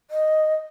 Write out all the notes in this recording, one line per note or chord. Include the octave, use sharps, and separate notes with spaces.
D#5